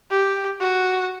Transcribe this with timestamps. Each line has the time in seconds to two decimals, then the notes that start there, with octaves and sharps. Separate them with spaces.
0.11 G4
0.60 F#4